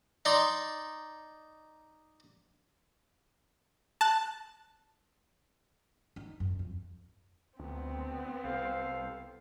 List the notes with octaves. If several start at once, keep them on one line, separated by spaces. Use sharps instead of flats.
D#4 D5 C6
A5 F#6
D#4
F#2
F2
D2 B3 C4
C2 A4 C5 F5